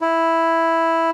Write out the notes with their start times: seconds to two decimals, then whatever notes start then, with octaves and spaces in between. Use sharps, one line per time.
0.01 E4